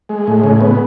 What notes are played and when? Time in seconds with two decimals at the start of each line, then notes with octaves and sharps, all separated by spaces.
0.09 G#3
0.27 A2
0.44 C#3
0.61 B3